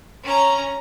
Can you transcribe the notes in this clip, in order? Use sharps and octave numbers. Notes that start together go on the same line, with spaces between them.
C#4 A#5